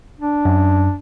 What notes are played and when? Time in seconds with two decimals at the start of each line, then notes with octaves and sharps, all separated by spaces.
0.20 D4
0.45 F#2